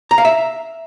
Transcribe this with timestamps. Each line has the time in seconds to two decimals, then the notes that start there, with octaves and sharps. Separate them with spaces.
0.11 A#5
0.18 F5
0.25 E5